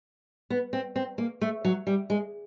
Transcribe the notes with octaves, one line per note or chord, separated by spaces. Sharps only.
B3
C4
C4
A#3
A3
F#3
G3
G#3